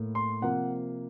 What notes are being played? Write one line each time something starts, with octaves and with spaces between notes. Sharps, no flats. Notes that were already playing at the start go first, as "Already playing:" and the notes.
Already playing: A2 A#3
C6
C3 F3 A#3 F#5